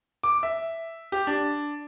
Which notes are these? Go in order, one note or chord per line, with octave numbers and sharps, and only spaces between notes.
D6
E5
G4
D4